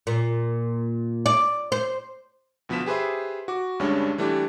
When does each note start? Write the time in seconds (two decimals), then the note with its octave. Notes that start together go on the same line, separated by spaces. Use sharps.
0.07 A#2
1.26 D5
1.72 C5
2.69 D2 B2 F3 B3 B6 E7
2.86 G4 G#4 B4 C5 E5
3.48 F#4 D6
3.80 D2 G2 G3 G#3 C#4 D4
4.18 E3 G3 A3 D4 G4